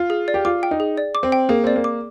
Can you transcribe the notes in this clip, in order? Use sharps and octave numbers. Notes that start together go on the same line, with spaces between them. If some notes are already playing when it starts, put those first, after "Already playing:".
Already playing: F4
G#4
D5
G4
F4 D6
G5
D#4
G#4
D5
D6
C4
G5
A#3 G#4
C4 D5
A#3
D6